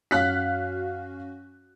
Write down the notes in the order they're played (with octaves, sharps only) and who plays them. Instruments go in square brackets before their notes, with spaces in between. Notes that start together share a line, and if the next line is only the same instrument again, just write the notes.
[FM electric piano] F#2 C#4 F#4 [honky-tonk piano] F5 F#6 B6